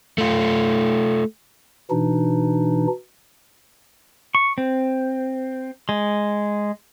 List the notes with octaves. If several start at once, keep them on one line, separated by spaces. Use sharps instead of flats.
A3 F4
B2 E3 D4 D#4
C#6
C4
G#3